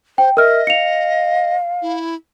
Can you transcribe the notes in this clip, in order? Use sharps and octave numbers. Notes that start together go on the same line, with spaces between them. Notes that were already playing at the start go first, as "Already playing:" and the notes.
C5 G5
A#4 D#5 E5 F6
F5 C#7 F7
E4